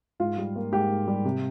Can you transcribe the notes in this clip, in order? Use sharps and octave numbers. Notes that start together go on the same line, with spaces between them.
G#2 F4
G3
A#3
G#2 G4
G#2
G3
C3